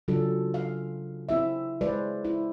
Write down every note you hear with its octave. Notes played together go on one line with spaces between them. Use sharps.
C#3 F#3 D4 F4 A4
F5
C4 E4 E5
G#3 B4 C5 D5
E4